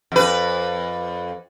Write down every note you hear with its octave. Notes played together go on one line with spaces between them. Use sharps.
F2 B4